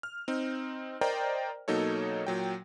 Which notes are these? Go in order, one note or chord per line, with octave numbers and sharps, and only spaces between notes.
F6
C4 D#4
A#4 C5 D5 D#5 G5 A#5
B2 F#3 A#3 D#4 A4 C#5
A#2 F#3 G5